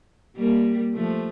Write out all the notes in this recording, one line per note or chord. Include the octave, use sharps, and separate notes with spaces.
G3 A#3
F3 A3